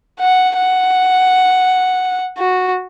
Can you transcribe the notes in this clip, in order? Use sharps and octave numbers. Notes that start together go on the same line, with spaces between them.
F#5
F#5
F#4